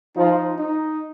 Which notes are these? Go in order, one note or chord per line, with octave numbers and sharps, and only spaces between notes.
F3 D#4
D#4